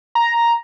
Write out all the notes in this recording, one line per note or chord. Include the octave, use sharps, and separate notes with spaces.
A#5